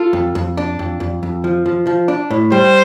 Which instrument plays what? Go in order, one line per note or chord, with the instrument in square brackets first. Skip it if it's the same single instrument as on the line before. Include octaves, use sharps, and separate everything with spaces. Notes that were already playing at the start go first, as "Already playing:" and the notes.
Already playing: [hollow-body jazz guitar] F4 [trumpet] A4
[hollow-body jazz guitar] F2
F2
D4
F2
F2
F2
F3
F3
F3
D4
A2
[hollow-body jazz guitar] G3 [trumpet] C5